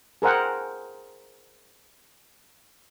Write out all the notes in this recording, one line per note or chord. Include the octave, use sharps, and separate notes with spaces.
G#4 A#4 C5 F#5 G5